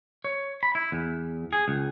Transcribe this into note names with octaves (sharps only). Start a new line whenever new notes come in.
C#5
B5
E4
E2
G#4
C#2